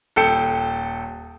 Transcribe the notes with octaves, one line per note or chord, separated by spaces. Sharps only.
D#1 A4 G5 C#7